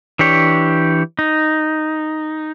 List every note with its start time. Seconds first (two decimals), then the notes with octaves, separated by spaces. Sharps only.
0.19 E3 D4 G4 C#5
1.19 D#4